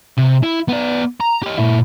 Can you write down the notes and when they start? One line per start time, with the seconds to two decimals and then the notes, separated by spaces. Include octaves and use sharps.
0.18 C3
0.43 E4
0.68 B3 D5
1.20 A#5
1.43 G4 D#5
1.58 A#2 E4